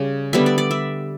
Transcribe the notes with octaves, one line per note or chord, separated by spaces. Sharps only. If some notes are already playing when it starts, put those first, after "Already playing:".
Already playing: C#3 G3
D3 G3 B3 E5
D5
D5
E5